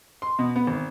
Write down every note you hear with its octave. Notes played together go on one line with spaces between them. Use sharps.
C6
B2
B3
G#1